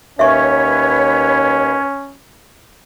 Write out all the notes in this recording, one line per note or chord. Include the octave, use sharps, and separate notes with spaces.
D#2 C#4 B4 C#5 E5 C#6